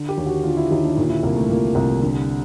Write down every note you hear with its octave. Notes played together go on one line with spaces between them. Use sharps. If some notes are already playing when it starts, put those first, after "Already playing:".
Already playing: D3
G4
D#2
F#4
D3 F4
E4
D#2 D#4
D4
A#2 D#4
E4
C2 A#3
A3
A#2 A#3
C2
D3